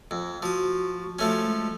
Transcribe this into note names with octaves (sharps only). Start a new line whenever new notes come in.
F2
F3 F#4 D#6
F3 A3 C#4
G#3